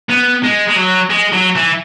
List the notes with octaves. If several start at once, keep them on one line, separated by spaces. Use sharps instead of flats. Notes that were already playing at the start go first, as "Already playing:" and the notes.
B3
G#3
G#3
F#3
G#3
F#3
E3